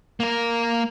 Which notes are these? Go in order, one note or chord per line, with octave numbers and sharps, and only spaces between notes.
A#3 A#4